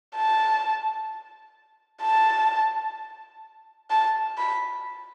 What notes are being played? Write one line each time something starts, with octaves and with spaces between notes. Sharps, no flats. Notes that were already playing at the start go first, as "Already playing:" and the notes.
A5
A5
A5
B5